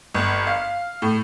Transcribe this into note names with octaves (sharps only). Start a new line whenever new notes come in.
G1
F5
A2